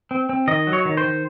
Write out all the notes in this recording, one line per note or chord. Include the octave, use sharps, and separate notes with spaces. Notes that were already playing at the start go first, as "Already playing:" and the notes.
C4
C4
D#3 D#5
F#3
C#5
D#3
C5
D#3